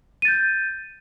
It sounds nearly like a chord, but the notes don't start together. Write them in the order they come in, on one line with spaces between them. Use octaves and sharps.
D#7 A6 G6